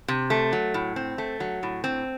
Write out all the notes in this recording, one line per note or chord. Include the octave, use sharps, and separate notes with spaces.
C3
A3
F#3
A2
C4
A3
F#3
A2
C4